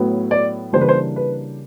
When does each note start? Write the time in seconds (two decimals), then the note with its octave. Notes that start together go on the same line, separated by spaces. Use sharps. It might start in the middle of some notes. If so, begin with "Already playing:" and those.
Already playing: A2 F#3 B3
0.31 D5
0.73 C#3 E3 G3 A#3 D4 C5
0.81 B4
0.89 C5
1.16 B4